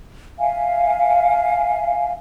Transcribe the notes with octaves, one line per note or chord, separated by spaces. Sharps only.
E5 F5 G#5